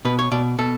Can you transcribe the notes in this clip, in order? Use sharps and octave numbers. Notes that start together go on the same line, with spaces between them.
B2 B4
C#5
B2 D5
B2 A4